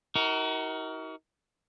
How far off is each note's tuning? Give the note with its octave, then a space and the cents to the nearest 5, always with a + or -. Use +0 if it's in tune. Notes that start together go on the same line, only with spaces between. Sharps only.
D#4 +45 F#4 +35 A#4 +0